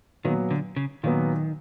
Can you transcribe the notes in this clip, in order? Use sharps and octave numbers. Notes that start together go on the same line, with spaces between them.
A#2 D#3 F#3 B3
D3
C#3
A#2 D#3 F#3 B3